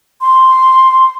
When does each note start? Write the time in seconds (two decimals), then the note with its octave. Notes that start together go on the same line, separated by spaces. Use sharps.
0.21 C6